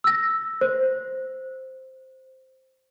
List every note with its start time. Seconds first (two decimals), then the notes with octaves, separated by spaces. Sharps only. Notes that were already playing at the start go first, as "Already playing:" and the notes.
0.04 E6 A#6
0.61 C5